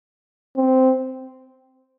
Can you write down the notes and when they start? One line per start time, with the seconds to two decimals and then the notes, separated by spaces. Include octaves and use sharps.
0.57 C4